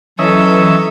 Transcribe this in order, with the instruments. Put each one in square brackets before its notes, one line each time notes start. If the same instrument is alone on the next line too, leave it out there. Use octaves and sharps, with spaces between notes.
[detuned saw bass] E3 [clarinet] F#3 [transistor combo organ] C#4 D#5 E5 [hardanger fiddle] A4